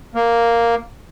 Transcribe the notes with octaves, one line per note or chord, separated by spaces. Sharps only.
A#3